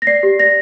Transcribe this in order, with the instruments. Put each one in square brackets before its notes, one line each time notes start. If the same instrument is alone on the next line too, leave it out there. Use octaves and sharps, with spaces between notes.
[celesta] A#6
D5 C7
G4
D5 A#6